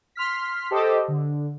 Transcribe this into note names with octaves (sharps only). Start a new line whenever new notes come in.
C6 F6 B6
G4 A4 C5 D#5
D3